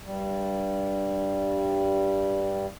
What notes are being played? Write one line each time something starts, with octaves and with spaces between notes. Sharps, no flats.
G2 G3